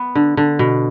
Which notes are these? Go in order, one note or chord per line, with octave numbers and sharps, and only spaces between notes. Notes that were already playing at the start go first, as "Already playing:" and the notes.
Already playing: B3
D3
D3
B2